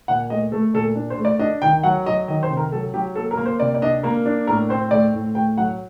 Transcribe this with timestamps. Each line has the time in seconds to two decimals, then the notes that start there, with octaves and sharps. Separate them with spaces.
0.08 A#2 F#5
0.30 A3 D#5
0.52 A3 A4
0.74 A#2 A4
0.96 D4
1.10 C5
1.17 A3
1.25 D5
1.39 D4 D#5
1.62 D#3 G5
1.83 F#3 F#5
2.06 F#3 D#5
2.28 D#3 D#5
2.43 C5
2.50 C3
2.57 A#4
2.72 F#3 A4
2.94 F#3 G4
3.15 A#3 A4
3.31 A#4
3.37 A#3
3.46 C5
3.60 C3 D5
3.74 D5
3.82 D4 D#5
4.03 A#3 A#4
4.26 D4
4.47 A2 A#4
4.69 C4 C5
4.91 A3 D5
5.13 A2
5.35 A3 G5
5.57 F#3 F#5